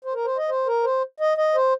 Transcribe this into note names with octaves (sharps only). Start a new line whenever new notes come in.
C5
A#4
C5
D#5
C5
A#4
C5
D#5
D#5
C5